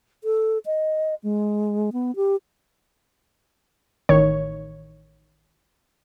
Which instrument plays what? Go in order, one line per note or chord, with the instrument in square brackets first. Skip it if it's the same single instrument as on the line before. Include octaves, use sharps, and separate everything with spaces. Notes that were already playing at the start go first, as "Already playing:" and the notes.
[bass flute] A4
D#5
G#3
B3
G4
[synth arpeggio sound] A1 D#3 C#5